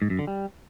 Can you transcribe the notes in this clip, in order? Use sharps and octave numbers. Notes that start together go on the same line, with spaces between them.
G#2
F#2
D3
G3